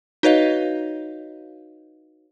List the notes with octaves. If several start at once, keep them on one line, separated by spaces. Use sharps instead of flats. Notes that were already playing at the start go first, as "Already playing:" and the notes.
D#4 F#4 B4 C#5 D#5 F5